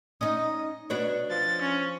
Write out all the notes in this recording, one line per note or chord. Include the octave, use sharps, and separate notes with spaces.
C#4 D#4 D#5
B2 D4 B4 C#5
F3 A6
C#4